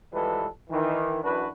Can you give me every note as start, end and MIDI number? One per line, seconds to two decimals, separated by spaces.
0.12 0.47 52
0.12 0.47 53
0.12 0.47 55
0.12 0.47 56
0.12 0.47 69
0.12 0.47 71
0.70 1.20 51
0.70 1.20 52
1.24 1.48 42
1.24 1.48 52
1.24 1.48 62
1.24 1.48 66
1.24 1.48 71